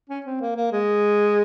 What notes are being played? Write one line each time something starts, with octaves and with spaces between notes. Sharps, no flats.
C#4
C4
A#3
A#3
G#3